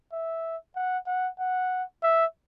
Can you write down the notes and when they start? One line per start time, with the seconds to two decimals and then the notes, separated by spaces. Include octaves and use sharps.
0.12 E5
0.76 F#5
1.07 F#5
1.39 F#5
2.03 E5